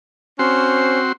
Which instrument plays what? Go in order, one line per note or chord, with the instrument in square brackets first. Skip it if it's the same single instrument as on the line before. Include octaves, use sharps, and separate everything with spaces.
[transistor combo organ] C4 F#4 C6 [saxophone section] C#4 C5